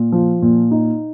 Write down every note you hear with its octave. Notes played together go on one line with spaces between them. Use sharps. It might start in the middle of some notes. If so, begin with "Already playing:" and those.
Already playing: A#2
F3
A#2
D#4